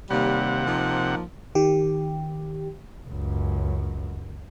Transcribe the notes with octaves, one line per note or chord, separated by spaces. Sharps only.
D#2 C3 G3 F5 F#5
F3 A#3 D#4
D#3 G4
C#2 F#2